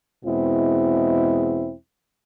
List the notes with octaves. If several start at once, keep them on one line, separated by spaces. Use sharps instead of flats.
E2 B2 G#3 C4 E4